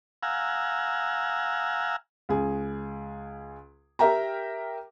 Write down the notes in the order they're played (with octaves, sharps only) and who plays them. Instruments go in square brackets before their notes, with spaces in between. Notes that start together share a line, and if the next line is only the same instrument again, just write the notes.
[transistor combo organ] F5 F#5 G#5 A#5 E6
[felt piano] C#2 G#4
G4 A#4 E5 G5 A#5